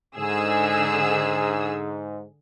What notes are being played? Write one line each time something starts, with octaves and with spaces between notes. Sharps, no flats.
G#2 D3 G#4 E6